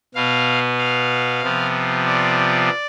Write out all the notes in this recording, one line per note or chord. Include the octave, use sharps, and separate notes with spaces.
B2 B3 F5
F5
C3 F3 B3
D5